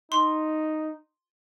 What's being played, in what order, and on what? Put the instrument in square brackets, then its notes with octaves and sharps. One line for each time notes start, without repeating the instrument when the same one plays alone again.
[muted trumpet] D#4 [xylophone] C6